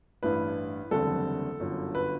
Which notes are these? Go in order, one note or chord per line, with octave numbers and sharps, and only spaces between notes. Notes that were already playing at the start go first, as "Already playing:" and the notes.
A1 G2 E3 B4
F#1 E2 D3 G3 C4 A4
G1 F#2 D3
B4